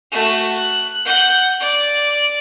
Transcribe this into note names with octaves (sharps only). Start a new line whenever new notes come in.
A3 F#4
F#6
F#5 G6
D5